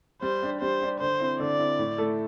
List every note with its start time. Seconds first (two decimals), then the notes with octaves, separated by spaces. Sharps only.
0.22 G3 C5
0.42 D4 G4
0.61 G3 C5
0.81 D4 G4
1.00 D3 C5
1.20 C4 E4
1.40 D3 D5
1.59 C4 E4
1.79 A2
1.98 A3 E4 A4